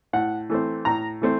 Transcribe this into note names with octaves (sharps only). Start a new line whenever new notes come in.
A2 F#5
E3 A3 C4
A2 A#5
E3 A3 C4